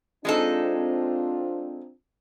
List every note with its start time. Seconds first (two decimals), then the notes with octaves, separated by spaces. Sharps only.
0.25 G#3 C4 D4 D#4 F4 A4